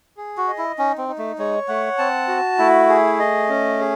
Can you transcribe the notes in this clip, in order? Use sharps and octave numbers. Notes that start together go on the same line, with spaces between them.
G#4
F#4
D#5
E4
C#4 D#4
C4
D#4
A3
G#3 C#5
A3 F#5
C4 A5
F#4
A3 E4
G#4
D#5
C#4
G#4